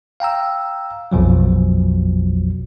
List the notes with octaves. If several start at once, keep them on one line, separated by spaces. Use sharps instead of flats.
F5 G5 A#5 E6
A#1 F2 B2 F3 F#3